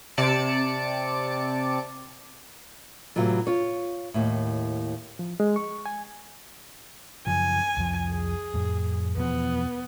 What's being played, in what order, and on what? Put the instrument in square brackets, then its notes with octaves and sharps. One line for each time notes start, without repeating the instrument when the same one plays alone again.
[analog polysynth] C3 D5 A5 C#7 D7
[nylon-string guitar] A2 C3 E3 F#3 F4
F4 C#5
D#2 A2
[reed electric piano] F3
G#3
C#6
G#5
[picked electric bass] F#2 C#3 F3 [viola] G#5
[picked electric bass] C2 F2 F3
[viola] G#4
[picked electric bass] F2 A2
[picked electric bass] E2 B2 F3 [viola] B3